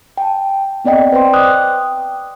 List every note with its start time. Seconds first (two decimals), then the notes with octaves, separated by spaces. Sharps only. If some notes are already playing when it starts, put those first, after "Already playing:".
0.17 G5 A5
0.84 B3 C4 D5 D#5 G5
1.12 B4 C5 D5 G5 C6
1.33 D6 D#6 F#6
1.52 G5